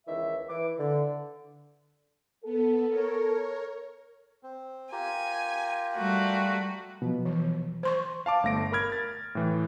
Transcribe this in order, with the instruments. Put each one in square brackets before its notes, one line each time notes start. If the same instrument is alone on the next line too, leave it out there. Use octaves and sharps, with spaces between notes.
[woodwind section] C#2 D#3 E3 E5
E3 D6
D3
[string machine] B3 [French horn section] A4
[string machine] A#4 C#5
[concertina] C4
[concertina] F4 G4 A#4 [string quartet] G#5
[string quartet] G3 A3 F#4
[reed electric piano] B2 F3 F#3
[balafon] E3
C5 C6 C#6
[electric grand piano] F5 A5 D6
G1 A3 A#6 D7
A#4 B5 F6 G#6
G#6 A6
A2 E3